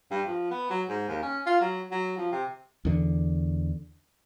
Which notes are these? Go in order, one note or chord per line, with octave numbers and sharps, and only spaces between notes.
G2
F3
B3
F#3
G#2
D#2
C#4
F4
F#3
F#3
F3
C3
E2 D3